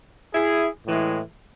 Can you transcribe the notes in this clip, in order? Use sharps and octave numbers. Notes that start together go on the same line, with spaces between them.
E4 G#4
A2 E3 G#3